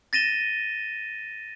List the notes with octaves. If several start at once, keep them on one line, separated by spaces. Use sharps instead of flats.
A6 A#6 D#7 E7 G7